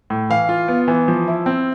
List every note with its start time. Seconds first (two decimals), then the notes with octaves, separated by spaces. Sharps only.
0.10 A2
0.30 E3 F5
0.49 F4
0.68 B3
0.88 E3
1.08 F3
1.28 E4
1.46 C4